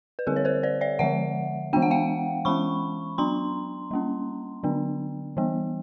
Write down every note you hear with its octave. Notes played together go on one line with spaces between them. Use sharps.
B4
D3 G3 C4 G#4 A#4
C#5
A#4 C5
C5 D5
D5 E5
D3 F3 G#3 E5 F#5
E3 G#3 B3 D4 G5
F#5
F5 G5
E3 G#3 C#4 B5 C#6
F#3 B3 D4 A#5 C6
G3 A#3 C#4
D3 F#3 B3 D4
E3 G3 B3